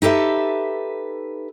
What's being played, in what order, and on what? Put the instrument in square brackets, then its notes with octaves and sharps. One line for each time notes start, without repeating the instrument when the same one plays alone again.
[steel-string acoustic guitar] D#4 G4 A4 B4 E5